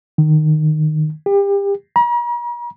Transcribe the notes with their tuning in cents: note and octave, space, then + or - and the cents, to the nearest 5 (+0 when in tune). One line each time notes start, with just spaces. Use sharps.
D#3 -15
G4 +30
A#5 +45